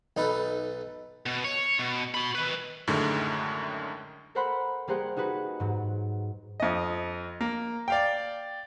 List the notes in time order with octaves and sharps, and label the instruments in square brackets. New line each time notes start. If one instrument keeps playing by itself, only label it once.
[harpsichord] B1 D#4 A4 B4
[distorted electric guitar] B2
C#5
B2
F#4 B5
D#3 B4
[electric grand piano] F#2 A2 D3 D#3 G#3
[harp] A4 A#4 C5 F#5 B5 C6
G3 A#3 G#4 A#4 C5 F#5
D#4 F#4 G#4 B4
G#2 F#3
[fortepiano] F2 D#5
A#3
D5 F5 G5